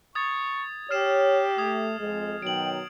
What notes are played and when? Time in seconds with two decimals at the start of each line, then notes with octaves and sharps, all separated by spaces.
0.15 C#6 D#6 G#6 A6
0.91 G4 C#5 F6 C7 E7
1.58 A3 D#6 G#6
1.99 F2 G#3
2.42 B2 D#3 F#3 G5 D7 F#7